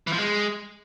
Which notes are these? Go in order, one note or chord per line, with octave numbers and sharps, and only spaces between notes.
E3
F3
G#3